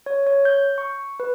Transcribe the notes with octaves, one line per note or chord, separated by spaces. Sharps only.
C#5
C#5
G6
C#6
B4